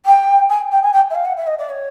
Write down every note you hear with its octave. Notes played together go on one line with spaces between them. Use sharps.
G5
G#5
G5
G#5
G5
E5
F5
F#5
E5
D#5
D5
C#5